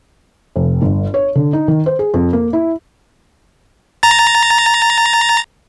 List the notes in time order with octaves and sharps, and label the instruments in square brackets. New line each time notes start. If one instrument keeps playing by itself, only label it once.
[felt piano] F1
G1
C#5
D3
D#4
D#3
C5
G#4
F2
A#3
E4
[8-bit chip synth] A#5 A6